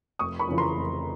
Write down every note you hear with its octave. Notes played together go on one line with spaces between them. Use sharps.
F1 C#6 D#6
B5 C#6
F2 C#3 E3
A#5 C6
F1